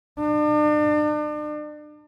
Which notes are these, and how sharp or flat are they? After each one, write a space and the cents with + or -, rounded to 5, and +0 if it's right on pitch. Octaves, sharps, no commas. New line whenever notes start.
D4 +40